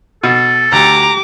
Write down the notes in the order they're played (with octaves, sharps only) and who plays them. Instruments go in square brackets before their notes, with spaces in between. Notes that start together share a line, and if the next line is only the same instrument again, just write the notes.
[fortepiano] B2 [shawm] A4
[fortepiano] D2 [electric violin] G4 D6 [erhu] A#5